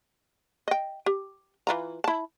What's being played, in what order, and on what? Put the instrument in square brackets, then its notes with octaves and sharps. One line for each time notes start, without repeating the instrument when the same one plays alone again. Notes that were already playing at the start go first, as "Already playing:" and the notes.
[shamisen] D#5 G5
G4
E3 F4 A#5
E4 A5